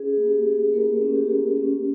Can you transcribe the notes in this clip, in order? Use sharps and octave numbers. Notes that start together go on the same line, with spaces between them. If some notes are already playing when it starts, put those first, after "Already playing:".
Already playing: C#4 G#4
A#3
G4
G#4
A#3
G#4
G#4
A#3 E4 A#4
C#4
G4
A#3
C#4